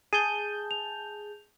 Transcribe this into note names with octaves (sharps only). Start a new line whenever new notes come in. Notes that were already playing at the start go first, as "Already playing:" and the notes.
G#4 A5 G6 D#7
F7